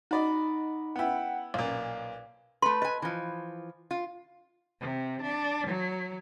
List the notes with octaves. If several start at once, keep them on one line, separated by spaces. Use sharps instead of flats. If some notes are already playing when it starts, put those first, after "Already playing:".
D#4 F#4 D5 D#5 B5
B3 E4 F#5 G5
B1 A#2 F5
A3 B4 C6
B4 D#5 G#5
E3 F3
F4
C3
D4
F#3